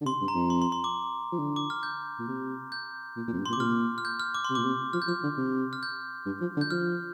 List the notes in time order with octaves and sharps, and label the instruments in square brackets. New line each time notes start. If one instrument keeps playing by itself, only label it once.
[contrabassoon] D3
[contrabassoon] C3 [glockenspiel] C6
[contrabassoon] G2
[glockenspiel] A#5
[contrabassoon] F2
[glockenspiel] C6
C6
C6
D6
[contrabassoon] F3
D3
[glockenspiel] D6
F6
G6
[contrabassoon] A#2
C3
[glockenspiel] G6
[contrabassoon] A#2
A#2
F2
G2
[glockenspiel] C6
[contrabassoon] A#2
[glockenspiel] D6
[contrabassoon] C3
[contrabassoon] A#2 [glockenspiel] F6
[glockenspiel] F6
G6
F6
D6
C6
[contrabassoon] C3
[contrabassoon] A#2 [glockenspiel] D6
[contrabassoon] C3
[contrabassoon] F3 [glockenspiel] F6
[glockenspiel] G6
[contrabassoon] F3 [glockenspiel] F6
[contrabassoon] D3
C3
[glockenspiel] F6
G6
[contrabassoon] G2
F3
D3
[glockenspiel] G6
[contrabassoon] F3 [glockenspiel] F6